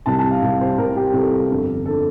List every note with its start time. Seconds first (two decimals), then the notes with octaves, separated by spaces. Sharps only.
0.06 C2 C3 G3 A5
0.19 A5
0.31 F5
0.42 C2 C3 G3
0.61 C5
0.78 C2 C3 G3 A#4
0.96 G4
1.13 C2 C3 G3 A4
1.49 G1 F2 D3
1.86 D3 A4